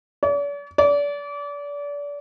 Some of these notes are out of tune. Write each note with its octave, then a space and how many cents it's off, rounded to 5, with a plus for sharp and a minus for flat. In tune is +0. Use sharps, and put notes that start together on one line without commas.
D5 -45
D5 -30